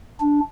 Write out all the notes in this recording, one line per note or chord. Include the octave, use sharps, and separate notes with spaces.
D4